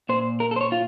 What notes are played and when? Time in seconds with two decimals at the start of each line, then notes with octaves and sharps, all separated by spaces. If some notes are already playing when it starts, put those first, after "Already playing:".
0.09 A#2 C5
0.40 A#4
0.51 A4
0.56 C5
0.61 C#5
0.72 F4